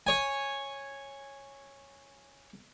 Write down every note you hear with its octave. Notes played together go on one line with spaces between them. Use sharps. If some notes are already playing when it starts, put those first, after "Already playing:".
C#5 G#5